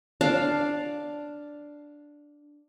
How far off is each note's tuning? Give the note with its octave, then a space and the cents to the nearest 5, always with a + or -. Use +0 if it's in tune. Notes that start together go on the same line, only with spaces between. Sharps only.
D4 +0 F5 +0